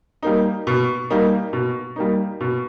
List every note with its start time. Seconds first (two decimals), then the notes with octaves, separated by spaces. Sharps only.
0.23 G3 A#3 D#4
0.67 B2
1.10 G3 A#3 D#4
1.53 B2
1.96 G3 A#3 D#4
2.41 B2